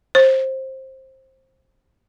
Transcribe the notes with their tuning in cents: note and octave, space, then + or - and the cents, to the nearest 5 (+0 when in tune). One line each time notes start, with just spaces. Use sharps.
C5 +20